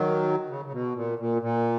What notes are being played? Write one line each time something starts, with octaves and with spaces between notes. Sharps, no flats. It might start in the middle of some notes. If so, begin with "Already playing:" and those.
Already playing: D#3 F#3
C#3
C#3
B2
A#2
A#2
A#2